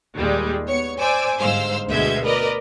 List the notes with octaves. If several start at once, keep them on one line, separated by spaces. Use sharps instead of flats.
D#2 A#2 G3 G#3
B3 C#5 C#7
C5 D5 G#5 D6 E6
G1 G#2 C5 F5 E6
D2 B2 G#3 E5 G6 G#6
A#4 B4 D5 D#5